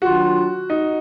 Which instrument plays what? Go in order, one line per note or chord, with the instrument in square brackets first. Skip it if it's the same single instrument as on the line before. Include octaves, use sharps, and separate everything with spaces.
[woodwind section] D#3 F#3 D4 F4 [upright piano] F#4
[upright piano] D#4